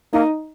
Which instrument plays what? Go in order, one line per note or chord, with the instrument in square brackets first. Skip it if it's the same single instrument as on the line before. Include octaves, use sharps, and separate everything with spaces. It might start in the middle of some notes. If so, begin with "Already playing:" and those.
[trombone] A#3 [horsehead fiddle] D#4